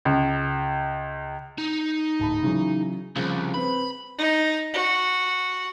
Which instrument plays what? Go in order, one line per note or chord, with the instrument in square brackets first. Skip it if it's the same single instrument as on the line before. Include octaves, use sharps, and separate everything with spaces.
[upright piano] C#2
[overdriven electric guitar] D#4
[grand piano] D1 A5 B5
C#3 E3 F#3
[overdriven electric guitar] C2 [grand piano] C#3 F3
[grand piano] C4 B4 [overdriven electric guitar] B5
[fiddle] D#4
F#4